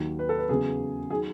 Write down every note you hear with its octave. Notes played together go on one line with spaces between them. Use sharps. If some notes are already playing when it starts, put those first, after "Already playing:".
Already playing: D#2 D#3 F#3
B4
A4
B4
E2 C#3 F#3 G#4
D#3 F#3 G#4